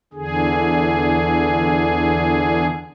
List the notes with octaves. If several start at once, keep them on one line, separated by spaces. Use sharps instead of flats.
E2 D3 G#4